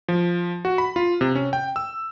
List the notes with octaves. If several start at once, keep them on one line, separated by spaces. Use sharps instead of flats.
F3
F#4
B5
F4
C3
C#4
G5
E6